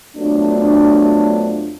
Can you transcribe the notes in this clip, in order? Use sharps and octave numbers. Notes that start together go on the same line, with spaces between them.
F2 F#3 A3 B3 D4